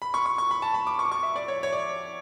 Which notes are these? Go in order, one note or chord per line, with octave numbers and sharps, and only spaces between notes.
B5
C#6
C#6
C#6
B5
A5
B5
D6
C#6
D6
C#6
E5
D5
C#5
C#5
D5